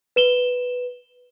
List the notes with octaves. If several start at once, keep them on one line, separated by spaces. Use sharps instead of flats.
B4 E7 G7